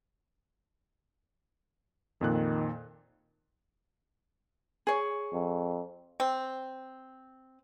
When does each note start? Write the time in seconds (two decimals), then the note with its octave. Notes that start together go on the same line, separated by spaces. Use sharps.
2.21 F2 A#2 D#3 F#6
4.87 G#4 C#5
5.33 F2
6.20 C4